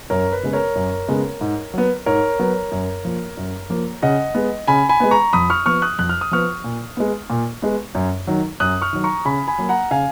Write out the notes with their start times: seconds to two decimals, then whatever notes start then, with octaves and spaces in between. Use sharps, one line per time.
0.10 F#2 A#4 C#5
0.32 B4
0.43 C#3 G#3 B3
0.53 A#4 C#5
0.76 F#2
1.08 C#3 G#3 B3
1.41 G#2
1.74 F#3 B3
2.06 G#2 A#4 C#5
2.39 F#3 B3
2.72 F#2
3.05 F3 A#3
3.37 F#2
3.70 F3 A#3
4.02 C#3 D#5 F#5
4.35 G#3 B3
4.67 C#3 G#5 B5
4.89 G#5 B5
5.00 G#3 B3
5.11 A#5 C#6
5.33 F2 B5 D#6
5.50 C#6 F6
5.66 F3 B3 C#6 F6
5.82 D#6 F#6
5.99 F2 F#6
6.09 F6
6.21 D#6
6.31 F3 B3 C#6 F6
6.64 A#2
6.97 G#3 B3
7.30 A#2
7.62 G#3 B3
7.95 F#2
8.27 D#3 F#3
8.60 F#2 D#6 F#6
8.82 C#6 F6
8.93 D#3 F#3
9.04 A#5 C#6
9.25 C#3 G#5 B5
9.48 G#5 B5
9.58 F#3 A#3
9.69 F#5 A#5
9.91 C#3 F5 G#5